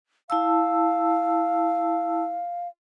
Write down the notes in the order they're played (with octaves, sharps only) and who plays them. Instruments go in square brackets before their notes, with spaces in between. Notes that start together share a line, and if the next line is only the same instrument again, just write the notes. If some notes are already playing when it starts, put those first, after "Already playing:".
[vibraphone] E4 A5 E6 [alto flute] F5